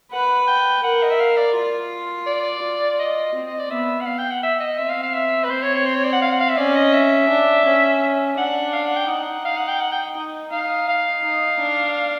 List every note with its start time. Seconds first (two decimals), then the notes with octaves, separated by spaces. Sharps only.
0.12 B4 F#5
0.47 G5
0.83 A#4 F#5
1.03 D#5
1.10 E5
1.20 F5
1.37 D5
1.55 F4
2.26 D5
2.63 F4
2.99 D#5
3.35 C4
3.47 D#5
3.59 D5
3.70 B3 E5
4.01 F#5
4.06 F5
4.18 G5
4.31 F#5
4.43 E5
4.60 D#5
4.78 C4 E5
4.89 F5
5.02 F5
5.13 E5
5.44 B4
5.50 C4 C5
5.62 C#5
5.74 C#5
5.85 C5
5.94 C#5
6.04 D5
6.12 F#5
6.21 F5
6.30 F#5
6.40 F5
6.49 E5
6.57 C#4 D5
6.75 D#5
6.93 E5
7.29 D4
7.65 C#4
8.37 D4 F#5
8.73 F5
8.85 F#5
8.96 G5
9.09 D#4 F#5
9.45 F5
9.57 F#5
9.68 G5
9.80 F#5
9.92 G5
10.17 D#4
10.51 D#4 F5
10.88 F5
11.24 D#4
11.60 D4